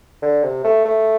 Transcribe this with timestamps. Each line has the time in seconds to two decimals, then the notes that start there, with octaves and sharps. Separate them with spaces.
0.22 D3
0.43 C3
0.64 A3
0.86 A3